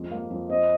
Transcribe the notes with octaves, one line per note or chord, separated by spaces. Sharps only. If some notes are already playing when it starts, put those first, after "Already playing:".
Already playing: F2 G#3
A#3
F2
C4 D#5